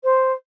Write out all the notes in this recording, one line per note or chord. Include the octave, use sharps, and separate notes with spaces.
C5